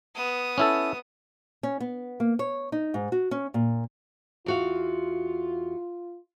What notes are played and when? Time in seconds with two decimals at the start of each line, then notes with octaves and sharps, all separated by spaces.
0.15 B3 D#6
0.58 C#4 E4 A4
1.63 C#4
1.80 B3
2.20 A#3
2.39 C#5
2.72 D#4
2.94 G#2
3.12 F#4
3.31 C#4
3.54 A#2
4.46 E2 F4 F#4 F5